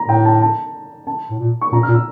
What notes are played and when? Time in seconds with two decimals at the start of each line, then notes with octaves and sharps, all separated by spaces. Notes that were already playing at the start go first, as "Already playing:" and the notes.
Already playing: A#5
0.08 A2 G5
0.25 A5
0.42 A5
1.07 A5
1.30 A2
1.39 A#2
1.61 C#6
1.72 A#2 A#5
1.83 F6
1.89 A#2
1.94 E6